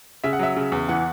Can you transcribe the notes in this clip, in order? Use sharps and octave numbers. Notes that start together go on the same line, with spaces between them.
C#3 E5
F#5
F#3 E5
C#3
E2
E3 F#5